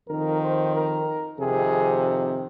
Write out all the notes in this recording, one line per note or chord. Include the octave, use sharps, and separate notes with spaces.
F2 D#3 A#4
C5
A#4
F2 C3 D#3 G#4